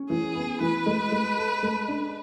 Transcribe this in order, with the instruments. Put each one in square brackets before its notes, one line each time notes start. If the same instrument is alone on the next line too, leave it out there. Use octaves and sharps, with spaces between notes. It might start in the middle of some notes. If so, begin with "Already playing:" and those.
Already playing: [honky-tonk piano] C#4
[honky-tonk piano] E3 [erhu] G#4
[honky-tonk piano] B3
[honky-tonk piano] E3 [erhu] B4
[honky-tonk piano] G#3
G#3
A4
G#3
D4